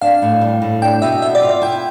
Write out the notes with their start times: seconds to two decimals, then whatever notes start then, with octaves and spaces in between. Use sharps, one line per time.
0.02 D4 F5
0.22 A2
0.41 G3
0.62 A2
0.82 D4 G5
1.02 B2 E5
1.22 B3 E5
1.35 D5
1.42 F4
1.49 D5
1.62 E4 G5